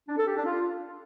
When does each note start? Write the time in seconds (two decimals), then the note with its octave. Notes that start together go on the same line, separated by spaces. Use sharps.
0.09 D4
0.18 A4
0.27 G4
0.37 D4
0.46 F4